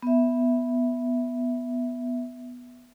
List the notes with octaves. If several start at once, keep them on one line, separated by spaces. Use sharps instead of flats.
B3 E5